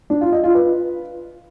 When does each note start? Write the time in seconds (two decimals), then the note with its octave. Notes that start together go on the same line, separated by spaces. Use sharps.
0.10 D4
0.21 F4
0.32 D#5
0.44 F4
0.55 B4